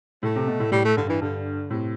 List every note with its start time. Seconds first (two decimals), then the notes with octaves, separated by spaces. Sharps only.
0.23 A2 A3
0.35 C3
0.47 B2
0.60 A2
0.72 A2 G3
0.85 A3
0.97 G2 D3
1.09 E3
1.22 G2 D3
1.70 A2 C3